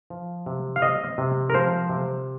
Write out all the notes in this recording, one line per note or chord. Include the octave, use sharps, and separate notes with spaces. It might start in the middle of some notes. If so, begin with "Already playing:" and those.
F3
C3
F5
C4 D#5
C3
A#4
F3 C5
C3